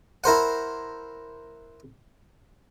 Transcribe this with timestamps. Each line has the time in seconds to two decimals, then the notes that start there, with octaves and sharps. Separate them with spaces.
0.24 E4 A#4 C5 F#5